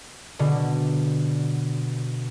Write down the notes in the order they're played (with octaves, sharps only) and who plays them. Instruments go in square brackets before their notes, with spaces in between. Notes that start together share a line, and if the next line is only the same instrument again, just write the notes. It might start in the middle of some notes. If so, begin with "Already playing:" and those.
[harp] B2 D3